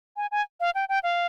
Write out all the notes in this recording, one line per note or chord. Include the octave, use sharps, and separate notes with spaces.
G#5
G#5
F5
G5
G5
F5